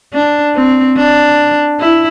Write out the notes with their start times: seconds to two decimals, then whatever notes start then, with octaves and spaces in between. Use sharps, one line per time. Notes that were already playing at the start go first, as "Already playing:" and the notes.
0.14 D4
0.55 C4
0.97 D4
1.80 E4